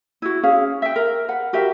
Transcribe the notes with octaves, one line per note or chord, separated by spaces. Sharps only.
E4 F#4
C#4 G#4 F5
E5 G5
A#4
B4 F#5
F#4 G4 A#4 E5